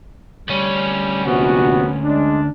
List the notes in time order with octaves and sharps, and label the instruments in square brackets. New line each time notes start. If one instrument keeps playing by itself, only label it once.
[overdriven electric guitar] D2 C#4 [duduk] G3
[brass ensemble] A#1 C3 F#4 [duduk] B3
[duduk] G#3 [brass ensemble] D4